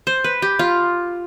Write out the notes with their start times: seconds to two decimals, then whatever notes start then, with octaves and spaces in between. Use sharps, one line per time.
0.07 C5
0.24 B4
0.42 G4
0.59 F4